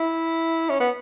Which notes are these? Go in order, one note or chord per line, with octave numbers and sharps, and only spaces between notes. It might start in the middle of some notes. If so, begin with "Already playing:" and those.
Already playing: E4
C#4
B3